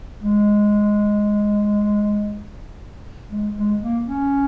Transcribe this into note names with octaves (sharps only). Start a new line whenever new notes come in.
G#3
G#3
G#3
A#3
C#4